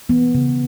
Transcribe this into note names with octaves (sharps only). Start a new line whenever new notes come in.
E3 B3
C#3